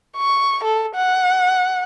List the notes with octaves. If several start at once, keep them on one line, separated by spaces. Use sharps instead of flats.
C#6
A4
F#5